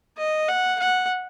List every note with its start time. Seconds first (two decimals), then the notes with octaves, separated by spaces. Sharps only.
0.17 D#5
0.48 F#5
0.79 F#5